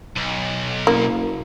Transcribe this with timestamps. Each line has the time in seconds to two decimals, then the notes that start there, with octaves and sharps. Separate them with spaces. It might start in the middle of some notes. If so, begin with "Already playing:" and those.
0.16 B1
0.87 F#1 A#3